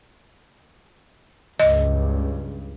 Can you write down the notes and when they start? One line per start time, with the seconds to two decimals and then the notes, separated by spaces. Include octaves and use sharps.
1.60 C#2 G2 D#5